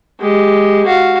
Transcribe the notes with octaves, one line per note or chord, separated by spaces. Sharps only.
G#3 G4
F#4 F5